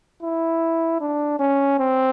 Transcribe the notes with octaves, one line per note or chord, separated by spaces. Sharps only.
E4
D4
C#4
C4